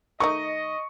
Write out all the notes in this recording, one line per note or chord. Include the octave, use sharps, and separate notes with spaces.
D#3 A3 D#4 D#5 C#6